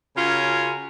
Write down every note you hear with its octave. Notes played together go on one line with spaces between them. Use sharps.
C#3 C#4 F4 F#4 A#4 G#5